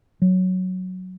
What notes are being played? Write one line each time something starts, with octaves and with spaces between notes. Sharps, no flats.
F#3